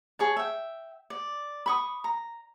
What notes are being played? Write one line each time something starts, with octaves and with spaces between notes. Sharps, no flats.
G#4 C#5 A5
E5 G5
D5
B5 C#6 D#6
A#5